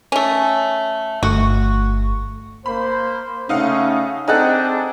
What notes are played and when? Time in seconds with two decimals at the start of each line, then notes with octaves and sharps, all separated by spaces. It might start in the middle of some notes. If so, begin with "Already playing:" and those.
0.12 A3 C#4
1.23 G1 A3 F#4 C#6
2.66 A#3 C5 B5
3.49 C#3 A3 C#4 D#4 F5 F#5
4.28 C4 D4 D#4 G#4 A4 F#5